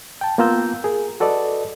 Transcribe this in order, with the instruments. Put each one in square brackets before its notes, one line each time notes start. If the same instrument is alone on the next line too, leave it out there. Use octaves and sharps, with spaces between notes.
[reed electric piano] G5 A5
A#3 B3 F4 A#5 E6 G6
G#4 A#4
F#4 A4 B4 D5 D#5